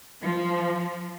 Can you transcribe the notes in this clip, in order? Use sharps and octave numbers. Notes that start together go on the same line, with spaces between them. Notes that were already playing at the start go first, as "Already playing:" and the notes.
F3